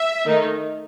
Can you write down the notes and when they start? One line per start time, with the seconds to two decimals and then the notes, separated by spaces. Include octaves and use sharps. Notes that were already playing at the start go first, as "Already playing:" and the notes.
Already playing: E5
0.26 D#3 A3 D#4